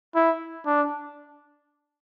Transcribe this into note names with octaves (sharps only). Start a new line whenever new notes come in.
E4
D4